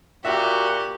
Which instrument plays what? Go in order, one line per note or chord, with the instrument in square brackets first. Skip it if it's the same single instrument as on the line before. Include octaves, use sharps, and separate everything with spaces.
[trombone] A#2 [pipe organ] F#4 [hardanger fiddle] G4 [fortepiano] E5